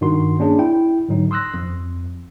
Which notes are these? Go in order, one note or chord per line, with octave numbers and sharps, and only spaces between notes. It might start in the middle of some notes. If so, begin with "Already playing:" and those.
G2 D#3 D#4 F#4 C6
A#3 C#4 D4 G#4
E4 G5
G#2 D3 F#3 D#4
C6 D#6 E6 F#6 A#6
F2